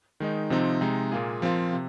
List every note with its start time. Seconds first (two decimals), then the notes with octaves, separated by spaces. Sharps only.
0.20 D#3 G#3 D#4
0.50 C3 F3 C4 D#4
0.81 C3 G#3 D#4
1.12 A#2 A#3 F4 G#4
1.42 F3 C4 F4 A#4
1.73 C3